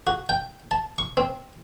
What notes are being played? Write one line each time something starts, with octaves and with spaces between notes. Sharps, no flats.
F#4
G5
A5
C#6
C4